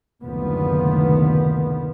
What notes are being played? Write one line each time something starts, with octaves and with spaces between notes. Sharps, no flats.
F#1 D2 C3 D#3 F3 B3